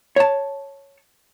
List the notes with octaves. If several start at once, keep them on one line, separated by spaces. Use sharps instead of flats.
C#5 A5